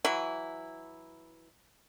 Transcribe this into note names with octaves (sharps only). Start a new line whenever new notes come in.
E3 F#3 E4